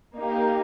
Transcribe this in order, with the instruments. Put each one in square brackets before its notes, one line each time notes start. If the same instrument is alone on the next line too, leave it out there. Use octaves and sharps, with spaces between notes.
[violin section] A#3 D#4 G4